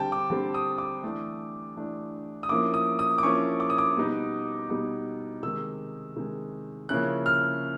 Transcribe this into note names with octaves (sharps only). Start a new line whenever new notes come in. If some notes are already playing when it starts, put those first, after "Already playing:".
Already playing: D3 G3 C4 G5 A5
D6
D3 G3 C4
D#6
D6
E3 A3 D4
E3 A3 D4
D#6
F3 A#3 C#4 E4 D6
D#6
D#6
D6
F3 A#3 C#4 E4 C#6
D6
D#6
D6
B2 G3 B3 D#4
B2 G3 B3 D#4
C3 D#3 G#3 E6
C3 D#3 G#3
C#3 F3 A#3 C#4 E4 F#6
F6